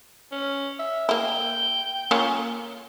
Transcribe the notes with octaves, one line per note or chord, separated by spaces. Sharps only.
C#4
E5
A#3 E4 G5
A#3 C#4 F4